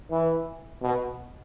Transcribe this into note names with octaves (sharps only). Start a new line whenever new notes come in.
E3
B2